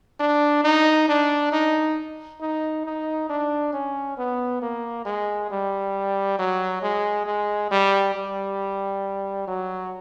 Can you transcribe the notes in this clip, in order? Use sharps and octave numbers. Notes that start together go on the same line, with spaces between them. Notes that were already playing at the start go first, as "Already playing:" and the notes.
D4
D#4
D4
D#4
D#4
D#4
D4
C#4
B3
A#3
G#3
G3
F#3
G#3
G#3
G3
G3
F#3